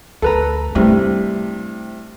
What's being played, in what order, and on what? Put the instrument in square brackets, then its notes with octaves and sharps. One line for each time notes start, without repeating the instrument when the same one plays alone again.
[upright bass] D2 [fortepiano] A4 B4 A#5
[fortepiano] G2 C3 [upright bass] A3 E4